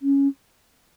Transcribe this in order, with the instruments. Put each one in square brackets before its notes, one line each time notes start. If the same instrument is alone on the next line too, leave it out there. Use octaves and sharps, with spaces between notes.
[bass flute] C#4